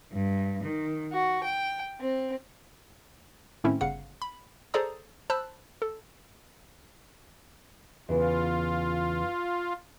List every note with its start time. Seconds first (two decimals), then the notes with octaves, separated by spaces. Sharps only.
0.13 G2
0.62 D#3
1.14 F#4
1.44 G5
2.02 C4
3.64 A2 D#3 A3 C4 C#4 E4
3.81 G1 C#3 F5 F#5 C#7
4.22 B5
4.74 G#4 A4 C5 D5 A#5 D#6
5.30 C5 A5 B5 E6 F#6
5.82 A4
8.09 E2 C#3 E3 F4